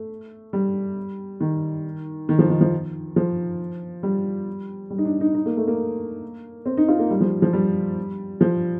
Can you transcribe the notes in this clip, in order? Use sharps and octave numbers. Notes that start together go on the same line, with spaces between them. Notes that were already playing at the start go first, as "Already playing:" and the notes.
Already playing: A3
G3
D#3
D#3
F3
D#3
F3
F3
G3
G3
D#4
D4
D#4
D#4
A#3
A3
A#3
C4
D#4
F4
A#3
G3
F3
F3
G3
F3